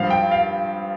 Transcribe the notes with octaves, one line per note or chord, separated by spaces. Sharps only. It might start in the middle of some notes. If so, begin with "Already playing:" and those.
Already playing: G2 F3 F5
G5
F5